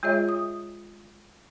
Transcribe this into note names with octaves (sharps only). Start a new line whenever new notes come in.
G#3 F4 G#4 C#5 D#5 E5
D#6